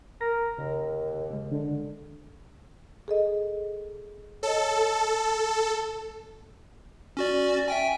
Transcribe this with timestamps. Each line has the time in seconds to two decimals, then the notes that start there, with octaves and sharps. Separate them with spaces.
0.21 A#4 A#6
0.58 D#2 C#3
1.31 C#3 G#3
1.51 D3
3.08 G#4 A4 D#5
4.43 A4 C#5 D#5
7.17 C#4 F#4 D5
7.68 E5 G5 G#5